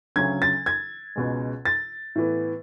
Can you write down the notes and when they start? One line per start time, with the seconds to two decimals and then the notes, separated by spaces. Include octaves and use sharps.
0.16 D2 C#3 F#3 C#4 G#6
0.42 A6
0.66 G#6
1.16 C#2 B2 G#3
1.65 A6
2.15 A2 E3 B3